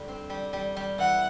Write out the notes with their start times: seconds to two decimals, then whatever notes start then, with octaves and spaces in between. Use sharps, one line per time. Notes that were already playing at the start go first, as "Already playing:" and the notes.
Already playing: D3 G3
0.08 C4
0.30 G3
0.53 G3
0.77 G3
0.98 E3 F#5